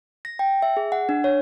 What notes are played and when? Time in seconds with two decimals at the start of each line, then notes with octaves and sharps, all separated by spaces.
0.25 A#6
0.39 G5
0.62 E5
0.77 G#4
0.92 F#5
1.09 D4
1.24 C#5